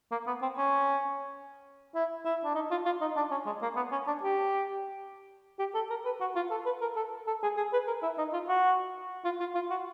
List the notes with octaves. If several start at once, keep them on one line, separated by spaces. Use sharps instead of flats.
A#3
B3
C4
C#4
E4
E4
D4
D#4
F4
F4
D#4
D4
C#4
G#3
A#3
B3
C#4
D4
G4
G4
A4
A#4
B4
F#4
F4
A4
B4
A#4
A4
A4
G#4
G#4
B4
A#4
E4
D#4
F4
F#4
F4
F4
F4
F#4